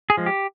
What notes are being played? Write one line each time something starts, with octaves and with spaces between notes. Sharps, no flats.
G#4
F3 G#3
G4